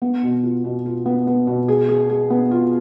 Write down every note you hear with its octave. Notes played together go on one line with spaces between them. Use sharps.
B3
B2
F4
B2
F4
B3
B3
B2
G#4
G#4
G#4
B3
F4